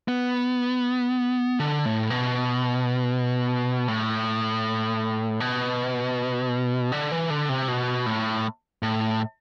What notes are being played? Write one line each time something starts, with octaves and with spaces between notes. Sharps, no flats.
B3
D3
A2
B2
A2
B2
D3
E3
D3
C3
B2
A2
A2